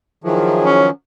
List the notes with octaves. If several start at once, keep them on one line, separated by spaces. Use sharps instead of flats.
D#3 F3 F#3 E4 G#4
C#4